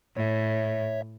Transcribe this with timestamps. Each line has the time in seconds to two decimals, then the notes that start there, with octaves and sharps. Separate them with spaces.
0.17 A2 C#5 E5